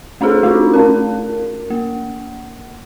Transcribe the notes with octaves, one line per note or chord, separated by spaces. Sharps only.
A3 D4 E4 G#4 A4
A3 D4 D#4 F4 F#4
A3 C#4 A#4
A#3